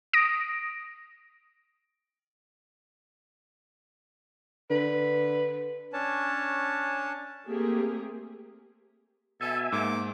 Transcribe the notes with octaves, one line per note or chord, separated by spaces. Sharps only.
D#6 A#6 D7
D3 B4
C#4 D4 C#5 A5
A3 A#3 C4 G4 G#4
B2 A4 E5 G#5
G#2 A#3 D6